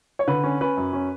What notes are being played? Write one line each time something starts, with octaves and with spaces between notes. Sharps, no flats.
C#5
D3 B4
C#4
C#4 B4
F#2
C#4